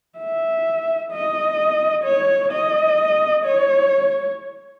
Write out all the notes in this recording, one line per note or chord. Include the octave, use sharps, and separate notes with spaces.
E5
D#5
C#5
D#5
C#5